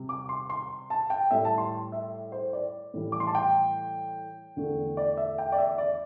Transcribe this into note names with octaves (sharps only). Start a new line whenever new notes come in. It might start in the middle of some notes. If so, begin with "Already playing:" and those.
Already playing: C3 G3
D6
C6
C6
A5
G5
A2 G3 E5
A5
C6
E5
C5
D5
A2 E3 G3
D6
C6
A5
G5
E2 D3 A3
D5
E5
G5
D5
E5
D5